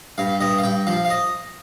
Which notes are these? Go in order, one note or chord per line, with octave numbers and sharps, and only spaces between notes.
G2 F5
G2 D#5
F5
G2 G5
F3 F5
F5
D#5